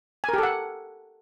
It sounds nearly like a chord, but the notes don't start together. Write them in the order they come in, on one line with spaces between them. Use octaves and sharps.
G#5 A#4 G4 A4 F#5